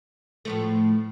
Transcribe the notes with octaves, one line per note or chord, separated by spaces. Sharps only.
A2 F3 A3